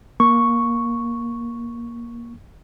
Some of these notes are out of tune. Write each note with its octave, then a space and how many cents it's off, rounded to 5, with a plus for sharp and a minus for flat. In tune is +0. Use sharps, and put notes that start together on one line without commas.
A#3 +15 C#6 +0